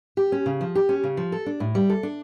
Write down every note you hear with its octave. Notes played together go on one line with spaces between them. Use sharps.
G4
C#4
C#3
F3
G4
C#4
C#3
F3
A4
D4
A2
G3
A4
D4